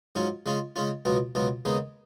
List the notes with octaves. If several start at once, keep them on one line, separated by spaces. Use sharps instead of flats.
G#2 F#3 C#4 F4
C#3 G#3 C#4 F4
C#3 G#3 C#4 F4
C#2 B2 F#3 B3 F4
C#2 B2 F#3 B3 F4
D#2 C#3 G#3 B3 D#4